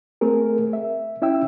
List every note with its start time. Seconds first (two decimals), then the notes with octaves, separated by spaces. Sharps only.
0.21 A3 C4 G#4 A#4
0.73 E5
1.22 C#4 E4 E5 G5 E6